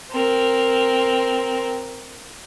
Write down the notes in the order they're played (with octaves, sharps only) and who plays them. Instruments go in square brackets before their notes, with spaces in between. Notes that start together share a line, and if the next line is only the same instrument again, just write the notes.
[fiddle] C4 A#4